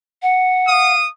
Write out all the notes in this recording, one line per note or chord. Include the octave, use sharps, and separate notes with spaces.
F#5
F5 D#6